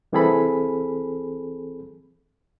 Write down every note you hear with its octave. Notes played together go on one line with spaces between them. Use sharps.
C2 E3 C4 G#4 A4 B5